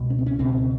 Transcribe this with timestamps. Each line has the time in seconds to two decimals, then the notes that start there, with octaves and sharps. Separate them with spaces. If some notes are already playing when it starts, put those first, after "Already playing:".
Already playing: C#2 B2
0.10 C#4
0.19 C4
0.26 C#4
0.39 C#2 B2 C4